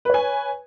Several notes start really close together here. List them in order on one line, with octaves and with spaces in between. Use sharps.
B4 C#5 G#5